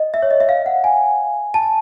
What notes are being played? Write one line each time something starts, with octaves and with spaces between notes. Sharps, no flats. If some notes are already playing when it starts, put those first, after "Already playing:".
Already playing: D#5
E5
C#5
D#5
E5
F5
F#5
G#5
A5